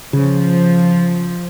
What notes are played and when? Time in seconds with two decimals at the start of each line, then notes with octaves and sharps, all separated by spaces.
0.13 C#3 F3